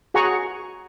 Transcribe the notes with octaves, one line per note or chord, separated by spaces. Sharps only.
F#4 G#4 F#5 G#5 A#5 C#6